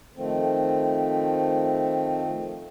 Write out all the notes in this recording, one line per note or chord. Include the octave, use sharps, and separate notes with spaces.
D#3 F3 A3 C4